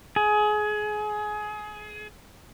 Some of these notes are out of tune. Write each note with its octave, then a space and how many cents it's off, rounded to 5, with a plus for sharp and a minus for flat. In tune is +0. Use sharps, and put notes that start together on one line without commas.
G#4 +25